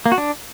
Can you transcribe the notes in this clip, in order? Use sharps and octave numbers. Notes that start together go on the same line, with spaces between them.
A#3
F#4
D4